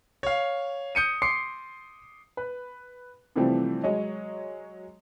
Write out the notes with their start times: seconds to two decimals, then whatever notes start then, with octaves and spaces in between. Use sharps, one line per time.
0.23 C#5 F5
0.95 D#6 G6 C#7 D#7
1.22 C6 D6 C7 C#7
2.37 B4
3.36 C3 E3 F3 G3 A3 C4
3.84 F#3 G#3 C#5 D#5